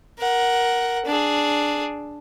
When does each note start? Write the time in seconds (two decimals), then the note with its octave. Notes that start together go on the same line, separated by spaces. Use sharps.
0.19 A#4 F#5
1.05 D4 G#4